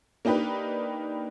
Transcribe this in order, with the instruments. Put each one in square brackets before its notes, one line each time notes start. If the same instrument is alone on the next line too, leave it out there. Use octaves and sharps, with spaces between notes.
[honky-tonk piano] A#3 D4 D#4 G4 B4